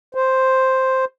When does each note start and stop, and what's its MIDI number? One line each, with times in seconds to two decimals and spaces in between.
0.15 1.05 72